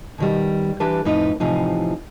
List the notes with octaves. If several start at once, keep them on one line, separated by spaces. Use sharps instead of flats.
B2 D#3 G3
E3 D4 G4 B4 A5
F2 A2 D#4 B4
A2 C3 E3 F3 D#4